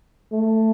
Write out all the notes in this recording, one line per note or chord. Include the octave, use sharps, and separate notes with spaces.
A3